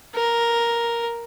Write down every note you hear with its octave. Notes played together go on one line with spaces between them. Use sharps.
A#4